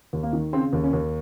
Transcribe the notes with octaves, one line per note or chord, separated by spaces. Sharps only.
D#2
A#3
D#3
C#3 C4
D#2
C#4
D#2